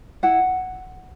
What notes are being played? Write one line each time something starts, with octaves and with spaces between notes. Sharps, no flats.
E4 F#5